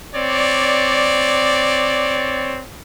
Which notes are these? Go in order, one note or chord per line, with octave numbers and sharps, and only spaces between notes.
C4 C#5 D5